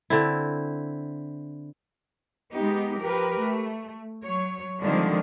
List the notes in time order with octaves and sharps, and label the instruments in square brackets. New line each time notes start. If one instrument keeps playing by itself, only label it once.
[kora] D3 C4 E4
[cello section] G#3 B3 D#4 G4
F3 G4 A#4 B4
A3
F#3 C#5
D3 D#3 F3 G3 G#3 C4